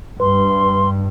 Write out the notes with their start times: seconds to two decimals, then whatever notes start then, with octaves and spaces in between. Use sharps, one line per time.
0.20 G2 B4 C6